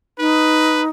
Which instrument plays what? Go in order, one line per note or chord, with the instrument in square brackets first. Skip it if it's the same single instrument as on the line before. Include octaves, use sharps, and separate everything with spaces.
[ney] D#4 [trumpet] B4